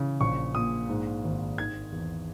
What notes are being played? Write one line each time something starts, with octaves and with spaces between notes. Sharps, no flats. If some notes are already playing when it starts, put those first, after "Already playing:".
Already playing: C#3 E3
A#1 C#6
A#2 D#6
G#2
G#1
D#3 G#6
E2